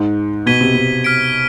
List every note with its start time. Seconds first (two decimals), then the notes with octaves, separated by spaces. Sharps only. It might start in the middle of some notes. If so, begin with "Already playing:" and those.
Already playing: G#2
0.46 B2 G#6 B6 D#7 G7
0.61 C3
0.75 C3
1.04 F6 B6 D7